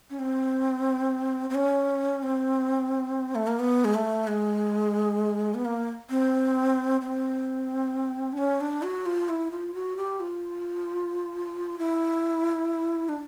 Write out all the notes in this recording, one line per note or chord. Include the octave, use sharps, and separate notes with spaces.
C#4
C4
C4
C#4
C4
A3
A#3
B3
G#3
A3
G#3
B3
A#3
C4
C4
D4
C#4
D4
F#4
F4
E4
F4
F#4
G4
F4
E4
D4